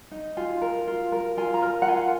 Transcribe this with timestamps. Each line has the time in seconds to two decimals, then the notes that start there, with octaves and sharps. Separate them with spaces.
0.11 D#4
0.37 F4 G#5
0.62 A#4
0.87 F4
1.12 A#4
1.37 F4 G#5
1.54 A#5
1.62 A#4
1.82 F#5
1.88 F4 G#5